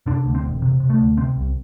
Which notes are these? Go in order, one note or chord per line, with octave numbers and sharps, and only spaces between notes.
C3 D4
D2
C4
E1
C3
C3
A3
D2
C3 C4
C2